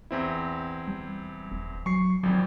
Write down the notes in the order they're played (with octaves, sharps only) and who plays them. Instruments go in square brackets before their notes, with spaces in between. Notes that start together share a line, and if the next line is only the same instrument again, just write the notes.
[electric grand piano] E2 C4 E4
[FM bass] G3
D#1
[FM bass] F#3 [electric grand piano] C#6 C7
[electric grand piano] G#1 F2 [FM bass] F#3